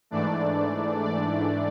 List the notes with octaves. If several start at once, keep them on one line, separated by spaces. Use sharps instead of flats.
G#2 E3 A3 D4 D5
D5